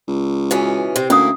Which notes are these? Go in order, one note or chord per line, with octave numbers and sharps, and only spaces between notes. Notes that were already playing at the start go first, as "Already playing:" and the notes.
C#2
B2 E3 C#4
C3 C4
D2 A#3 C#4 E4 D#6